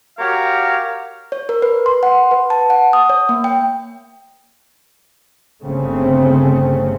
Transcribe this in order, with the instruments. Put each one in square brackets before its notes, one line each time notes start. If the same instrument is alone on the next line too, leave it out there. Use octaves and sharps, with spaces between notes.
[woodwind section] F#4 G4 A#4 C#5 F5
[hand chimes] C#5
A#4
B4
C6
F#5
B4
A5
F#5
D#6
C#5
A#3
G5
[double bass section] G1 C#3 A3 C4